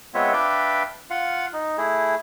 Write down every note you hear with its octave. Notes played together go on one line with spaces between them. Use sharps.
G#3 B3 C4 F4 C#5 E5
D4 B4 D5 E5 F5 G5
F4 F5 F#5
D#4
A3 E4 G#4